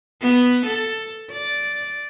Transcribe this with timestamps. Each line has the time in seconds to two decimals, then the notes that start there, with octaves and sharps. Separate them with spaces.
0.22 B3
0.67 A4
1.31 D5